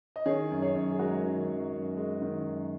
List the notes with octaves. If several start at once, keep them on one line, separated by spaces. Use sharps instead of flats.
D#5
D#3 G#4 C#5
F#2
G#4 C#5
F#2
G#4
G#3 F#4 A#4
D#3
F#2
F#2
G#3
D#3
F#2